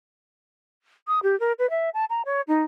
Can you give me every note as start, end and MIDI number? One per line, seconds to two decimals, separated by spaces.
1.08 1.20 87
1.23 1.38 67
1.40 1.53 70
1.59 1.69 71
1.70 1.90 76
1.94 2.05 81
2.10 2.22 82
2.25 2.41 73
2.48 2.63 63